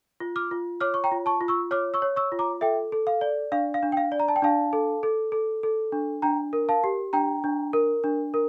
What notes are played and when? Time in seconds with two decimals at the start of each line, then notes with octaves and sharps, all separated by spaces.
0.20 F4
0.36 D6 F6
0.51 F4
0.81 C#5 D6 F6
0.94 C#6
1.04 G5 A#5
1.11 F4
1.26 A5 C#6
1.41 F4
1.48 C#6 E6
1.71 C#5 D6 F6
1.94 C#6 E6
2.02 C#5
2.16 C#6 E6
2.32 F4
2.39 A#5 D6
2.61 A4 E5 G5
2.92 A4
3.07 F5
3.21 D5
3.52 D4 F5
3.74 F5
3.83 D4
3.92 G5
3.97 F5
4.12 D5
4.20 A#5
4.28 A5
4.36 G5
4.42 D4 F5 A5
4.73 A4
5.03 A4
5.32 A4
5.63 A4
5.92 D4
6.22 D4 G5 A#5
6.53 A#4
6.69 F5 A5
6.84 G4
7.13 D4 G5 A#5
7.44 D4
7.73 A#4
8.04 D4
8.34 A#4